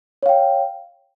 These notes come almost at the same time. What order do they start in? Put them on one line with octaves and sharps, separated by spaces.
C#5 F5 G5